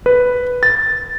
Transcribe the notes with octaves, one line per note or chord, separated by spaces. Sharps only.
B4
A6